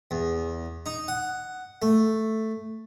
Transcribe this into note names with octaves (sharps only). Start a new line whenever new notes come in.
E2
D#4
F#5
A3